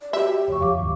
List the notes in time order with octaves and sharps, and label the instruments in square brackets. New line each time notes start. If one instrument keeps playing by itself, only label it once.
[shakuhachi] D5
[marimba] F#4 [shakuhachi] G4 [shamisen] E5
[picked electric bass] F1 [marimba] C#5 C#6
[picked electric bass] F2 [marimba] F5 D6
[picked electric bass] G1 D#2